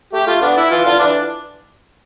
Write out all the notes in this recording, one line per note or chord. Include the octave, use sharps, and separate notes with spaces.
A3 G4
A3 F4
B3 D4
E4
E3 F4
D3 F4
E3 D4